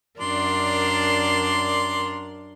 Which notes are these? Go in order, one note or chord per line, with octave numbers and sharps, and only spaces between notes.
F#2 D4 A#4 D5 C6